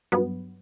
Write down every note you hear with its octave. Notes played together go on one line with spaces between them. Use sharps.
G2 F#3 B3